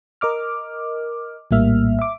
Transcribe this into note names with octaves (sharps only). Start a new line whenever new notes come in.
A#4 D#5 D6 F6
A#1 A2 G3 A#3 E5 F6
E5 D6